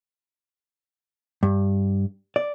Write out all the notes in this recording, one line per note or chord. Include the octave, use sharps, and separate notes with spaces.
G2
D5